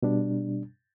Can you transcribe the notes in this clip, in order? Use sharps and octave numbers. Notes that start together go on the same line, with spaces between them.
B2 G3 D4